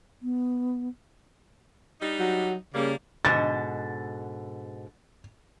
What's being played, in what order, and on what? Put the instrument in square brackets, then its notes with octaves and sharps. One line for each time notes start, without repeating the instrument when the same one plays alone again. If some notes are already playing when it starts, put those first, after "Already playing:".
[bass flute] B3
[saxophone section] G3 D4 D#4
[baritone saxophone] F#3
[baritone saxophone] C#3 [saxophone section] G3 A#3
[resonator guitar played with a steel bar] G#2 B2 D3 [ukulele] D#5 [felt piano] A6